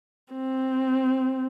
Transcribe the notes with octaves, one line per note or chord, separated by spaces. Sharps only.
C4